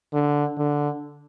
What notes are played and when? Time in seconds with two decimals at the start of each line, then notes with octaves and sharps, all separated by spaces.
0.13 D3
0.58 D3